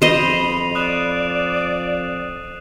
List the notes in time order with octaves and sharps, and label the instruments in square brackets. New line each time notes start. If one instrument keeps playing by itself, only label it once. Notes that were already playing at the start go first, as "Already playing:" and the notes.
[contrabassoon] F2 [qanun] C5 D#5 [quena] B5 [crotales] C7 D#7 F7
[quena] D5 [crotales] D#6 F#6 E7